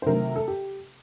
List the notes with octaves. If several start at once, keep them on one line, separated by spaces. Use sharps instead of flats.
C5
C3 D#3 F#3 A3 A#4
A4
G4